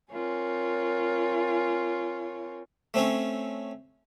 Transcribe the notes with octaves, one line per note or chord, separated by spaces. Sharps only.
C4 F4 A#4 C#5 G#5
A3 C4 C#4 C#5